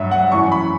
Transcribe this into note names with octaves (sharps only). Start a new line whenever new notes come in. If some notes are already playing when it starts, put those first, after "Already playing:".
Already playing: G2 F#3 E5
F#5
F#2 E3 C#6
B5